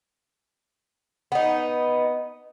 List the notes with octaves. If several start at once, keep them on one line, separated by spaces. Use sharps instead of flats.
B3 D#4